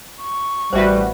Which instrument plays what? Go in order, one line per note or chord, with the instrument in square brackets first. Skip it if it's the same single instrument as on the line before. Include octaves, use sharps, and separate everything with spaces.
[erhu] C#6
[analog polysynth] A1 F#4 B4 [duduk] G3 [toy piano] C5 D5 E5